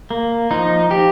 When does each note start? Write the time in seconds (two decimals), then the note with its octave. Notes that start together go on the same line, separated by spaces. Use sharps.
0.11 A#3
0.51 F3 D#4
0.90 F3 G4